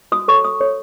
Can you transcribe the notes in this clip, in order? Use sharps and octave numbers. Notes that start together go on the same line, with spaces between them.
F#4 D#6
A4 C#5 C#6
F#4 D#6
A4 C#5